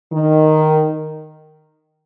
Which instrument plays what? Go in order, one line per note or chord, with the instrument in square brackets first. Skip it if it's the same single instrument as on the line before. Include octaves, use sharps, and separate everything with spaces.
[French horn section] D#3